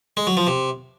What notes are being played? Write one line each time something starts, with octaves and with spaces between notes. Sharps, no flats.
G#3
F#3
F3
C3